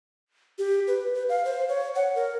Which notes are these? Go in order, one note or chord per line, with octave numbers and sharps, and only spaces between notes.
G4
B4
B4
F5
C5
C#5
F#5
A#4